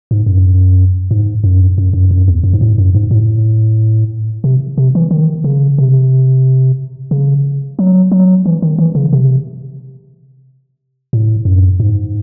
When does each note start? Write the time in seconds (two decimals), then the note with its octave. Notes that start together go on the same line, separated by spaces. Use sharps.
0.11 G#2
0.26 F#2
1.11 G#2
1.44 F#2
1.78 F#2
1.93 F#2
2.11 F#2
2.28 E2
2.44 F#2
2.53 G#2
2.61 A2
2.78 F#2
2.95 G#2
3.11 A2
4.44 C3
4.78 C3
4.95 E3
5.11 D#3
5.44 C#3
5.78 C3
7.11 C#3
7.79 F#3
8.12 F#3
8.46 E3
8.62 D#3
8.79 E3
8.95 C#3
9.13 C3
11.13 A2
11.45 F#2
11.80 G#2